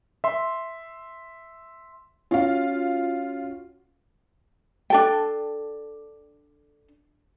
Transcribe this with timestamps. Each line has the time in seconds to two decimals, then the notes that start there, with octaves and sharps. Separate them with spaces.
0.24 E5 C6
2.31 C#4 F4 F#4 F5
4.90 D4 A4 G5